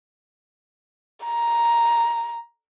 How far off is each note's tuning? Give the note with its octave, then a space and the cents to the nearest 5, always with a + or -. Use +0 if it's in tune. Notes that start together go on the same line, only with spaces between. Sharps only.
A#5 +5